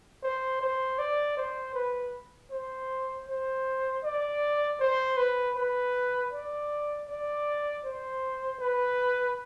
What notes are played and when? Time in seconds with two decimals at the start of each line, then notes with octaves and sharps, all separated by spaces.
0.23 C5
0.61 C5
0.98 D5
1.37 C5
1.74 B4
2.51 C5
3.27 C5
4.04 D5
4.79 C5
5.17 B4
5.56 B4
6.32 D5
7.08 D5
7.84 C5
8.60 B4